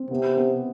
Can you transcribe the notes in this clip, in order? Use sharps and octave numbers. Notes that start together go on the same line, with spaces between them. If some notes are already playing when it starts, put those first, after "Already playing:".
Already playing: C4
C3 B3
B3